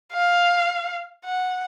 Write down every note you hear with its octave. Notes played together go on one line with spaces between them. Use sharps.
F5
F#5